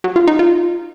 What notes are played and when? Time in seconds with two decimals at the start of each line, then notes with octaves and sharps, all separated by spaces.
0.04 F#3
0.16 F4
0.28 D#4
0.39 F4